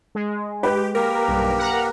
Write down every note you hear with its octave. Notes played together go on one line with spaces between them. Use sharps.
G#3
G4 B4
A#3 G4 A#4
B1 G2
F#5 A#5